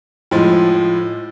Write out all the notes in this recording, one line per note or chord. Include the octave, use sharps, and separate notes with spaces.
A2 F3 G#3